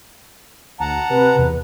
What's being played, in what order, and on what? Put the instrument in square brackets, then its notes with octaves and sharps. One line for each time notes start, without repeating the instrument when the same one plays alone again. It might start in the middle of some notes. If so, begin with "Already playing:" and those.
[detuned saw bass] D2 [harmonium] F#5 A5 A#5
[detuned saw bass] C3 [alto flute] B4
[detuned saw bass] E2